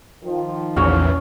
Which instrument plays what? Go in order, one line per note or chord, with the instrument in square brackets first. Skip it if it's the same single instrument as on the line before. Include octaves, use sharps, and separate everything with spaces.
[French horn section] D#3 F3
[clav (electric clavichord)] A#1 F#4 C#5 [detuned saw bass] E2 [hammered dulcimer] C#4